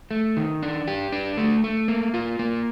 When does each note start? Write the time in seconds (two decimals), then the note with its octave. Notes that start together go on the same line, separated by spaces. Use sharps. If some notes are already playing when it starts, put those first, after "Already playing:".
0.11 A3
0.37 D#3
0.62 D4
0.88 G4
1.12 D4
1.37 A3
1.64 A3
1.88 A#3
2.14 F4
2.39 A#3